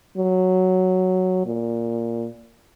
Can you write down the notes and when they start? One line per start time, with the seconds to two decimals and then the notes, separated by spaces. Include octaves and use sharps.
0.17 F#3
1.46 A#2